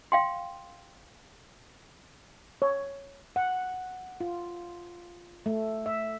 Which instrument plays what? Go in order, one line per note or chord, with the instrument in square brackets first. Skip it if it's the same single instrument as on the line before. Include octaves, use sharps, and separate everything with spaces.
[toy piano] F5 G5 C6
[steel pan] C#5
[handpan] F#5
F4
A3
E5